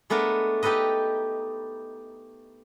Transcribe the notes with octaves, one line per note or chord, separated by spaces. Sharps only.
G#3 A3 B3 D4 A#4
D#4 G4 A4 B4 D#5